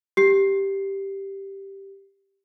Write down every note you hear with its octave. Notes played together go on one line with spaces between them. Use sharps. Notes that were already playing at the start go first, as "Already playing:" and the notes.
G4 C7